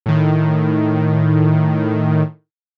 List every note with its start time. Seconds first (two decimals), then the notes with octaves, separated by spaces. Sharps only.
0.06 A2 D#3